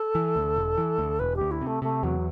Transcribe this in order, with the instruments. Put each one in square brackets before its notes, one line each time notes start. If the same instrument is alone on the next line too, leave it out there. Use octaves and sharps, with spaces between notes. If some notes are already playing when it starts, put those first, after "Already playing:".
Already playing: [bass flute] A4
[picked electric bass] E3
D2
E1
E3
D2
[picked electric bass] E1 [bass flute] B4
[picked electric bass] D2 [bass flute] G4
[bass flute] E4
[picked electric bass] C3 [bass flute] A3
[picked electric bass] C3 [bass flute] A3
[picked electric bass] E2 [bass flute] F#3